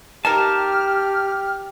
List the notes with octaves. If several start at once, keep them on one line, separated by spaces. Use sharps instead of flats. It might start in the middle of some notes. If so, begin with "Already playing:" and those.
A#3 D#4 G4 A#4 A5 F6